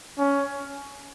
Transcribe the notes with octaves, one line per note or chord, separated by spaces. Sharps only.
C#4